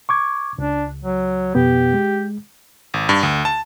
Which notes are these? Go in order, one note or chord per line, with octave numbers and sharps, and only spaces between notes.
C#6 D6 G#6
C#2 D4
F#3
F2 B2 B3 G4
G#3
G#1
G2
D2
A5